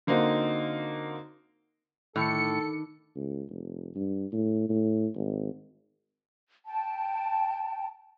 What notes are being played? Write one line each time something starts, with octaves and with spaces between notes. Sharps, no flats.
D3 A#3 C4 D#4 F#4
A2 D#3 D4 A4 C#7
C#2
F1
G2
A2
A2
G#1
G5 A5